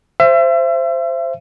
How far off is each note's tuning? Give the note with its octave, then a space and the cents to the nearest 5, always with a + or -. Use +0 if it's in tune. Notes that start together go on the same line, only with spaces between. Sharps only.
C5 +0 E5 +35